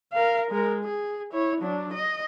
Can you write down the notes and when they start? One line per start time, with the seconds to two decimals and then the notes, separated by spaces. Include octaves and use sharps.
0.12 A#4 F5
0.51 G#3 A#4
0.84 G#4
1.32 E4 C#5
1.61 F#3 D4
1.93 D#5